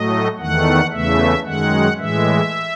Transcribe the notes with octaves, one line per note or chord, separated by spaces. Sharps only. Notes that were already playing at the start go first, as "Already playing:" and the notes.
Already playing: A2 F#3 A3 D#5
E2 D#3 A3 F#5
E2 C#3 E3 A3 E5
F#2 D#3 G#3 F#5
A2 E3 G#3 E5